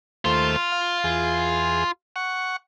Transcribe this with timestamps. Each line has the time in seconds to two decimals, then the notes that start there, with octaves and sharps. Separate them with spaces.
0.25 D#2 A3 F4 C5
0.72 F5
1.04 E2 G#4
2.16 F#5 C#6